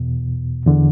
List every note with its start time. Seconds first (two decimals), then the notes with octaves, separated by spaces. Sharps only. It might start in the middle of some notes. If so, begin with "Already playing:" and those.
Already playing: E2 B2
0.66 E2 D3